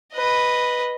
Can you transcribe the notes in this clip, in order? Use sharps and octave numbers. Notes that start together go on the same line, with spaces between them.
B4 D#5